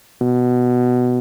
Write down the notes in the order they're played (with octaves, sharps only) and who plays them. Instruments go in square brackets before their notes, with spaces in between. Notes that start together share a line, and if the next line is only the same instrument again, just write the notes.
[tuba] B2